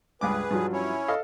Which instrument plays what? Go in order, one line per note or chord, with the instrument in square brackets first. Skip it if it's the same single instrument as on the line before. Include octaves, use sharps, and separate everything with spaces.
[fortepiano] C#2 G2 D6 [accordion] G#4 B4
[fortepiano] G2 F3 F#3
[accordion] C#4 E4 C#5
[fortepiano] A4 D#5 F5